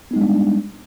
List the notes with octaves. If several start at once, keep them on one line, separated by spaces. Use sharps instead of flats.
G3 G#3 B3 D4 D#4